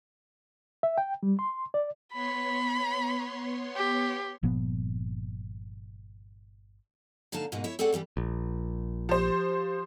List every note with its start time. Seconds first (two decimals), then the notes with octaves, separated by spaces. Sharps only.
0.83 E5
0.98 G5
1.23 G3
1.39 C6
1.74 D5
2.13 B3 C#5 B5 C6
3.76 G4
4.43 G1 A#2 F3 B3
7.32 A#2 D3 D#4 F5 A5
7.52 G#2 B2 G#3 A#3 D#4
7.64 E4 C#5
7.79 C4 G#4 A4 C#5 D5 F#5
7.93 E3 G3 A#3 C4
8.17 A#1
9.09 F3 G4 C5